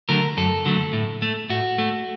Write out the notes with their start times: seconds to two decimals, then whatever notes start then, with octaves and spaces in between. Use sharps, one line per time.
0.09 D3 F#3 A3 A#4
0.37 F#2 A4
0.65 D3 F#3 A3
0.93 A2
1.22 A3
1.50 A2 F#4
1.78 A3